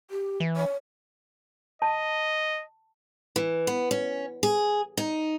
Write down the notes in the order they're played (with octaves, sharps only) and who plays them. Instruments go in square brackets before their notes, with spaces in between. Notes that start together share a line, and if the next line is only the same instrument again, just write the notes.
[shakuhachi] G4
[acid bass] E3
[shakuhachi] C#5
[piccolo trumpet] D#5 [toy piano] A5
[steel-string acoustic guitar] E3
B3
C#4
G#4
D#4